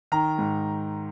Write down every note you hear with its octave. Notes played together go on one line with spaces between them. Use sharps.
D#3 A#5
G#2